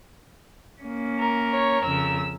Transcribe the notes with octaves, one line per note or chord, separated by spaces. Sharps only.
A#3 C#4
A#4
C#5
F2 C#3 E6